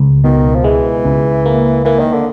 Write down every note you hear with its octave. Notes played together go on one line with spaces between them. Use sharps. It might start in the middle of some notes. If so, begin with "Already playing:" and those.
Already playing: C#2
B2 D#3
F3
E3 G#3
C#2
A#3
E3 A#3
D#3
D3